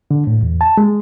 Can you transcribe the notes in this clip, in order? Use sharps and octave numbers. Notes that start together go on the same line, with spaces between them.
D3
A2
E2
A5
G#3